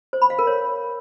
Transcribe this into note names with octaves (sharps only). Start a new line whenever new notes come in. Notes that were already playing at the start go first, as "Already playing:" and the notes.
C5
B5
F5
A#4
C#5